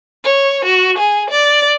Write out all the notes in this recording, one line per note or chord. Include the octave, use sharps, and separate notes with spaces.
C#5
F#4
G#4
D5